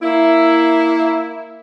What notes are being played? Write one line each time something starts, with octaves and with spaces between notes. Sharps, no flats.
A#3 E4